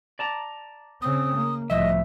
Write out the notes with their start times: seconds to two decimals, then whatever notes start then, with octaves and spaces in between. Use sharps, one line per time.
0.19 D5 A5 A#5
1.02 C#3 C4 D#6
1.35 A#3
1.70 C2 A2 F3 D#5 E5